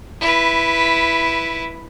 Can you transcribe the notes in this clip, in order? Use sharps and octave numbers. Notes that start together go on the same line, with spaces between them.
E4 B4